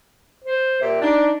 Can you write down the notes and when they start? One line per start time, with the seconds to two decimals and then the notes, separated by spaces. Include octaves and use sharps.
0.44 C5
0.81 A#2 G4 E5
1.02 D4 D#4